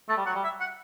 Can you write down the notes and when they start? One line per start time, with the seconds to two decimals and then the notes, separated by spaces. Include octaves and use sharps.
0.08 A3 A5
0.17 G3
0.26 F#3 F#5
0.35 G3
0.44 E5
0.60 F#5